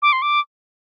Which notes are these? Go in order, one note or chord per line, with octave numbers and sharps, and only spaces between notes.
D6
C6
D6